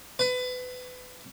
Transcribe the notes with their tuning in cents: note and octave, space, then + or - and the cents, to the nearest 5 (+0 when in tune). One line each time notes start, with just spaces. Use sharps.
B4 +25